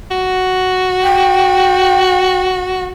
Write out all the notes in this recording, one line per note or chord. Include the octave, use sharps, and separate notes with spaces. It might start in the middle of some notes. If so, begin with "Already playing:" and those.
F#4
G5